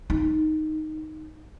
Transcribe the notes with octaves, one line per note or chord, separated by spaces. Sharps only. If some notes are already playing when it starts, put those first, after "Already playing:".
D#4